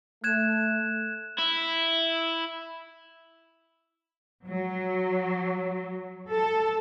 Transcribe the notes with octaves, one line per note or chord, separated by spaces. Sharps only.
A3 F#6 G#6 E7
E4
F#3
A4